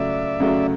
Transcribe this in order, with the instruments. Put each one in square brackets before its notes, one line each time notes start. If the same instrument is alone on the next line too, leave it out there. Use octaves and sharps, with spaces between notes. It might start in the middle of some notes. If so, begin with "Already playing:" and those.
Already playing: [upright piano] C#2 C#3 F#3 A3 [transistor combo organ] D5 E5
[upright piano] C#2 C#3 F#3 A3